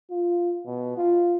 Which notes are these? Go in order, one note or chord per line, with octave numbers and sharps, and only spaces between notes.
F4
B2
F4